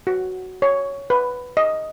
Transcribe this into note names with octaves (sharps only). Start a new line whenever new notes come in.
F#4
C#5
B4
D#5